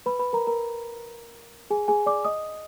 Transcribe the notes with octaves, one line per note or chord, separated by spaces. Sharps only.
B4 B5
B4 B5
A#4 A#5
A#4 A#5
G#4 G#5
G#4 G#5
D5 D6
D#5 D#6